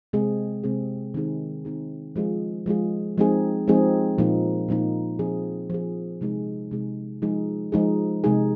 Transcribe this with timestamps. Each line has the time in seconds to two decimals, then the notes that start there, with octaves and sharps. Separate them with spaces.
0.13 C3 G#3 C4 G#4
0.63 C3 G#3 C4 G#4
1.14 D#3 C4 D#4 G#4
1.65 D#3 C4 D#4 G#4
2.16 F3 G#3 F4 G#4
2.66 F3 G#3 F4 G#4
3.18 F3 G#3 C4 D#4 G#4
3.68 F3 G#3 C4 D#4 G#4
4.18 A#2 F3 A#3 D#4
4.68 A#2 F3 A#3 D#4
5.19 F3 C4 G#4
5.70 F3 C4 G#4
6.21 C3 G#3 D#4 G#4
6.71 C3 G#3 D#4 G#4
7.22 F3 G#3 D#4 G#4
7.72 F3 G#3 D#4 G#4
8.24 C3 G#3 D#4 G#4